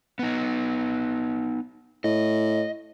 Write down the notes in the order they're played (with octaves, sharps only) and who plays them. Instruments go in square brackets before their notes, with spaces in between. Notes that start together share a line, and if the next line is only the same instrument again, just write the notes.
[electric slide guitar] B3 D#4
[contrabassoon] A2 [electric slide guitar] D#5